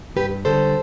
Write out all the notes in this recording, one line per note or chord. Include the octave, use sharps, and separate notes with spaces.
G2 G4 B4
D3 G3 A4 C5